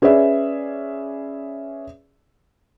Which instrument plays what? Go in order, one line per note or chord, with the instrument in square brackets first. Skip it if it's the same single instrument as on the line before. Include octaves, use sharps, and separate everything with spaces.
[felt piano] C#4 G#4 B4 D5 E5